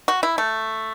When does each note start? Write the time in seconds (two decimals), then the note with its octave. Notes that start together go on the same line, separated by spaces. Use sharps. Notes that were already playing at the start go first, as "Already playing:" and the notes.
0.08 F#4
0.23 E4
0.38 A3